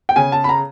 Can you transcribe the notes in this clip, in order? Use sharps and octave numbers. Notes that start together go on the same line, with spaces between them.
G5
C#3 G#5
A5
B5
A#5